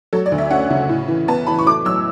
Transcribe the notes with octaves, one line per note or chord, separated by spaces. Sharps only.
F#3 A4
D5
D2
E5
C#4 F#5
C#3
A2
E3
B3 A5
E3 B5
C#6
A3 D6
F#3 E6